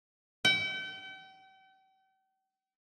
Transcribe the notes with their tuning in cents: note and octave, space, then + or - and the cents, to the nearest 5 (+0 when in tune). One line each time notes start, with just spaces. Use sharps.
G5 -40